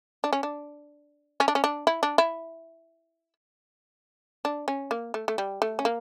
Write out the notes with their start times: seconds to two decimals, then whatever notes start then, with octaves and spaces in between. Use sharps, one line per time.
0.24 D4
0.33 C#4
0.43 D4
1.40 C#4
1.48 D4
1.55 C#4
1.64 D4
1.87 E4
2.03 D4
2.18 E4
4.45 D4
4.68 C#4
4.91 A#3
5.14 A3
5.28 A3
5.38 G3
5.62 A3
5.79 C#4
5.85 A#3